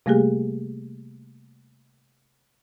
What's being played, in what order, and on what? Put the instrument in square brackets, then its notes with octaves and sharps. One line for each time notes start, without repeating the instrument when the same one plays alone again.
[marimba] C3 G3 A3 A#3 G4 G#4